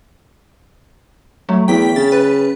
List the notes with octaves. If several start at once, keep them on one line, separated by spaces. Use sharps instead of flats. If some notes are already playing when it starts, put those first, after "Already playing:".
F#3 A3
E2 G5 B6
C#3 A6
B4